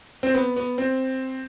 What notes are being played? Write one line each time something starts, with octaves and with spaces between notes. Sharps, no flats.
C4
B3
B3
C4